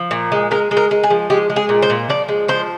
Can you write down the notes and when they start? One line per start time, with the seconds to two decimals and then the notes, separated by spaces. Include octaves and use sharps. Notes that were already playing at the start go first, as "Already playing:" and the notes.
Already playing: F3
0.11 A#2
0.32 G#3
0.51 G#3 A#4
0.71 G#3
0.77 A#4
0.91 G#3
1.03 G#4
1.10 F3
1.30 G#3 G4
1.50 G#3
1.56 G#4
1.69 A#2
1.82 C5
1.90 A#2
2.09 F3 D5
2.29 G#3
2.48 F3 C5